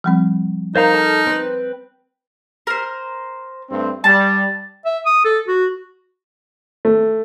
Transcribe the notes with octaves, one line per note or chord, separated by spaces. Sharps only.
F3 G3 C4
D#4 A#4 C5 F5 A#5
A4 F6
C4 B4
A#4 C5
G2 A3 C4
G3 A5
E5
D#6
A4
F#4
A3